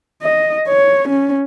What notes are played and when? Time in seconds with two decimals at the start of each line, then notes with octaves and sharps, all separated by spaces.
0.23 D#5
0.68 C#5
1.09 C#4